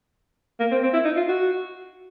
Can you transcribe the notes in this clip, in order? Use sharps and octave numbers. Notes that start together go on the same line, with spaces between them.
A#3
C4
C4
E4
D#4
F4
F#4